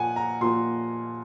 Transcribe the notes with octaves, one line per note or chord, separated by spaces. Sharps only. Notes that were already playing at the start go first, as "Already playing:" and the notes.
Already playing: A#2 F3 A#3 F#5 G#5
A#5
A#2 F3 A#3 C6